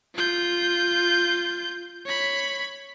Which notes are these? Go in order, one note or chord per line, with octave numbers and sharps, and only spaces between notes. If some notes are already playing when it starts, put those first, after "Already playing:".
F4 G6
C#5 B5